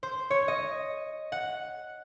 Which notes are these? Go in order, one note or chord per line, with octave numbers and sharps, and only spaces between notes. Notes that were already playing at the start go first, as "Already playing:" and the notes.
C5
C#5
D#5
F#5